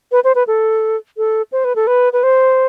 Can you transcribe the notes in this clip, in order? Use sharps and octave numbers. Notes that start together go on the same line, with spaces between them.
B4
C5
B4
A4
A4
C5
B4
A4
B4
B4
C5